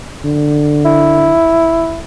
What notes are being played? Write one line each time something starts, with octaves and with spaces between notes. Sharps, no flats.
D3
E4